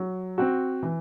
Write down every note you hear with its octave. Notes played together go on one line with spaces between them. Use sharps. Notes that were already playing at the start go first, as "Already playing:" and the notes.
Already playing: F#3
C4 F#4
E3